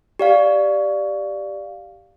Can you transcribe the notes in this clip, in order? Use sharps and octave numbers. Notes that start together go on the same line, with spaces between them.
G4 D5 F5